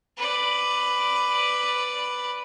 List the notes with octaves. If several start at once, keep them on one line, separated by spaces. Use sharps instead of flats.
B4 D5